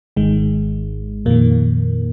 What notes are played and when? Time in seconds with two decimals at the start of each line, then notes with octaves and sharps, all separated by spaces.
0.16 G#1 G#2 D#3 G#3
1.26 F2 A#2 D#3 A#3